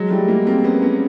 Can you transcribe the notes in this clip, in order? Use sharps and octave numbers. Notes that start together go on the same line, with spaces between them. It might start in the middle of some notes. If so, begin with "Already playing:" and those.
Already playing: F#3 G#3
G3 A3
G#3 A#3
A#3 C4
B3 C#4
B3 C#4